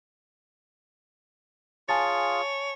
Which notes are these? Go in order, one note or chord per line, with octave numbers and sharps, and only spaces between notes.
F4 G#4 C#5 G#5 A5 A6